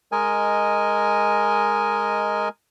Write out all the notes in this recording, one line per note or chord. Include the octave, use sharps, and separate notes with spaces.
G#3 A#4 D#5 G#5